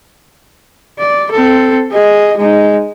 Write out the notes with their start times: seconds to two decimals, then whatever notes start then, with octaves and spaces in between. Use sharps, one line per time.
0.99 D5
1.32 C4 A4
1.92 G#4 D#5
2.38 G#3 D#4